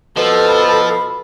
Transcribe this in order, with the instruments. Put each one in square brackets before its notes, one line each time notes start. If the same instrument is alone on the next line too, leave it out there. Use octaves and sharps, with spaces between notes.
[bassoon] B2 [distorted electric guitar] F3 [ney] A4
[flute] B5